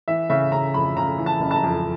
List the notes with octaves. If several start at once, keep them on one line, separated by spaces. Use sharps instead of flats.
E3 E5
C#3 E5
C#3 A#5
F2 B5
C#3 A#5
E3
A5
F#1
A5
A#5
F2